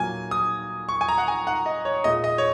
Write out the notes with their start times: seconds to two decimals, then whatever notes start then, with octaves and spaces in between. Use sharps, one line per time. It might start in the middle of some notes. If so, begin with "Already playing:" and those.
Already playing: A#2 F#3 A#3 G#5
0.31 D#6
0.89 C#6
1.01 G#5
1.08 A#5
1.18 F#5
1.28 G#5
1.47 F#5
1.66 D#5
1.85 C#5
2.04 A#2 G#3 D#5
2.24 D#5
2.38 C#5